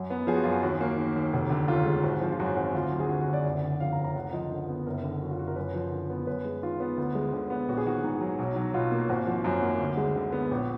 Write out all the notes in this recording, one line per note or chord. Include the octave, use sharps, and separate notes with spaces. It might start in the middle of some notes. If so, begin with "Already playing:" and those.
Already playing: F#2 F#3
B3
F3 G#4
F#4
F#2 F4
F#4
D#2 F#4
A#3
D#3
D#2
F1
D3
D#2 F4
G#3
G#1 F#4
F3
F4
F#2 F#4
G#1
D2 F4
F#3
G#4
D3 F#4
F#4
D2
D5
F#1
D3
F2 F5
A#5
F#1
A#5
D2 F#5
F3 D#5
D3
B3
F#1 A#4
D3
F#2 F#4
F4
F#1 F#4
A#4
F#2 B4
F3
D3
B3
F#2 B4
G#3
D#3 F4
B3
D2
G#3
D3
B3
A#1 F#4
G#4
D#3 F#4
G#2
F#3
B1
F#3
B2 F4
A#3
G#1 F#4
F3
F#2 F#4
A#3
D2
G#3
D3
B3
A#1